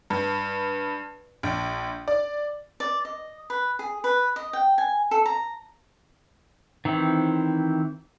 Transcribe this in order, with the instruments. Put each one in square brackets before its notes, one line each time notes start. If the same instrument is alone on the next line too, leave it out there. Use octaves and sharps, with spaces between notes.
[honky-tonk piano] G2
A#1
D5
[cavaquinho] D5
D#5
B4
G#4
B4
D#5
G5
G#5
A4
A#5
[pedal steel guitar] D#3 E3 C4 E4